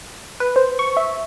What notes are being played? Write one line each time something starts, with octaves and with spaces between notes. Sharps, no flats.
B4
C5
C#6
E5